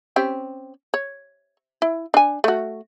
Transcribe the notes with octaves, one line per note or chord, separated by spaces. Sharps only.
C4 C#4 G4
C#5
E4
D4 G#5
A3 F#4